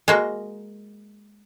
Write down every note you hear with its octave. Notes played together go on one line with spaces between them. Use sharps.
G#3 A#3 F#4